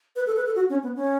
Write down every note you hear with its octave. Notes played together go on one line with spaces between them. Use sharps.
B4
A4
B4
A4
F#4
C#4
B3
C#4